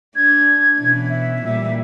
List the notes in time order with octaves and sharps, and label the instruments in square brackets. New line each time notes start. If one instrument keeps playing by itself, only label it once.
[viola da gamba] D4 [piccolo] G#6
[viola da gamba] B2 E3 C#4
[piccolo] E5
[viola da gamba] A#2 G3